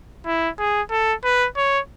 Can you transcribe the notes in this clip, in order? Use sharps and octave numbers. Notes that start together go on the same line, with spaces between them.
E4
G#4
A4
B4
C#5